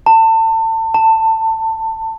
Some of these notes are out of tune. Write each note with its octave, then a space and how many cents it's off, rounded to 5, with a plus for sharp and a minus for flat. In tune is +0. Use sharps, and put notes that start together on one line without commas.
A5 +30
A5 +20